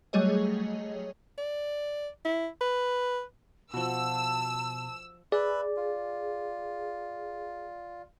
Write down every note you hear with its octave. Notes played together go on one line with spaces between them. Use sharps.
F#3 G3 A3 G#4 C#5 D#5
D5
E4
B4
B2 F3 F#4 A5 E6
G#4 B4 D5 E5 B5
F4